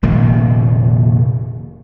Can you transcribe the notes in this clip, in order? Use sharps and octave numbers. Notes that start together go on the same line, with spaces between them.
F1 A#2 D#3 A#3